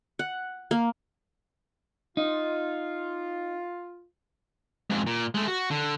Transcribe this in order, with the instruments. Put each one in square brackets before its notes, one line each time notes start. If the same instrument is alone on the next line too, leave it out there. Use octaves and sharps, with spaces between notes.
[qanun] F#5
A#3
[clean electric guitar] D#4 [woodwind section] F4
[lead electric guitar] F2 G#2
A#2
G#3 A3
F#4
D3